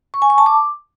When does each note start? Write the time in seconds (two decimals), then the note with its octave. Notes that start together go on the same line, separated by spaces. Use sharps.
0.14 C#6
0.22 G#5
0.30 C#6
0.38 A5
0.46 D6